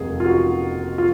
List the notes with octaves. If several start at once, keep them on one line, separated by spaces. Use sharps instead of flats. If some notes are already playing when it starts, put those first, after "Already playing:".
Already playing: F1 D#2 D#3 G#3 G#4
F4
F#4
F4